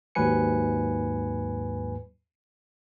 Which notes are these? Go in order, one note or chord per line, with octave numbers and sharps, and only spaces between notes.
D#2 G#2 F#3 B4 G#5 C#7